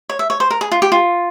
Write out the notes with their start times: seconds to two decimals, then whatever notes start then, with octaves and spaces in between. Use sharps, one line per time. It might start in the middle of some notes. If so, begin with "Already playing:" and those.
0.09 C#5
0.19 E5
0.30 C#5
0.40 C5
0.50 A#4
0.61 G#4
0.72 F4
0.82 G4
0.92 F4